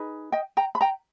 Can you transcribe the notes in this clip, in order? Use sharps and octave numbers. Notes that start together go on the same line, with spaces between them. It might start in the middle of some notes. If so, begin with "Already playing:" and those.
Already playing: D#4 G#4 B4
D#5 G5
G5 A#5
B5
G5 A#5